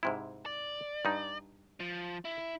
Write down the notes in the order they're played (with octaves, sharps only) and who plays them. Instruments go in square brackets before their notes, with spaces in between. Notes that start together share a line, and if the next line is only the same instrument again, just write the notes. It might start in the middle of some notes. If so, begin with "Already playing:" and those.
[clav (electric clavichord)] G#2 C3 E4
[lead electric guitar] D5
[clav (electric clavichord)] G2 D#4
[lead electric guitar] F3
E4